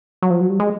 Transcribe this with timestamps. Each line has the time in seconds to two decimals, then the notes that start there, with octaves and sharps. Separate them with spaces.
0.22 F#3
0.30 F3
0.41 F#3
0.50 G3
0.60 G#3